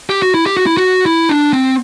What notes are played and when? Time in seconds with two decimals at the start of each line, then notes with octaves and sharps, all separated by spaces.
0.10 G4
0.22 F#4
0.34 E4
0.46 G4
0.57 F#4
0.66 E4
0.77 F#4
1.06 E4
1.29 D4
1.53 C4